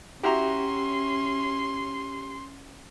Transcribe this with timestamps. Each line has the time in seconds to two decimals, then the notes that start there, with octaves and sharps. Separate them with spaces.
0.23 C#4 E4 F#4 G4 A#5 C6